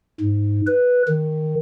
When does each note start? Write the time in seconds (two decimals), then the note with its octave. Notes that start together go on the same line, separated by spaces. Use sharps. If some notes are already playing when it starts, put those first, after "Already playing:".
0.20 G#2
0.67 B4
1.08 D#3